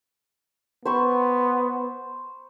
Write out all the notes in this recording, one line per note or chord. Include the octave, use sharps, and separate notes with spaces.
B3 C5 B5 C#6